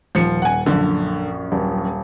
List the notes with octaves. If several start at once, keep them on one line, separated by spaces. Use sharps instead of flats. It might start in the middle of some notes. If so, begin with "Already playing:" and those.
D#1 F3 C#7
F#5 G#5
A#1 F#2 D3
D#1